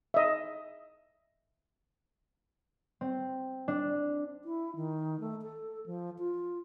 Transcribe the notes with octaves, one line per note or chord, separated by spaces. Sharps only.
D#5 E5
C4
D4
E4
D#3
A3
A4
F3
F4